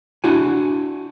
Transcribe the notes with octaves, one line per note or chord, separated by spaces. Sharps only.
D4 E4 F#4 G#5